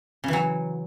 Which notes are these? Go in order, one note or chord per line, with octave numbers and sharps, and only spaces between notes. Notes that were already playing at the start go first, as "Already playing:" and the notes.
C#3 E3 F#3